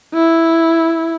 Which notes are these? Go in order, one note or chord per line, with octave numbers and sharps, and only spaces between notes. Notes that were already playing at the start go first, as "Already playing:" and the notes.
E4